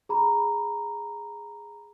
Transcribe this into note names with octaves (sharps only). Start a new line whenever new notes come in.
G#4 A#5 B5